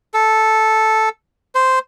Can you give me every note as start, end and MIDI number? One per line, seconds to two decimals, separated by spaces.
0.14 1.09 69
1.55 1.79 72